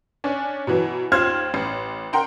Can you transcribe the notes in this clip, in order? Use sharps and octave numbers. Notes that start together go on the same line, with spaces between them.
C#4 D4
B2 E3 F#3
D#2 F4 C5 F6 G#6
A1
A#4 F#5 G5 A#5 C6